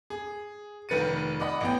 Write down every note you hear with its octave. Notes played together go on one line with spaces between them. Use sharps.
G#4
F1 D#3 B4 A6 C#7 D#7
D5 D#5 F#5 B5 D#6
A1 B3 G5